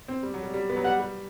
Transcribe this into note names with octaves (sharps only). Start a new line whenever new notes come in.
C4
G3
F#3
G3
G3
B3
F#3
G3 F#5
G3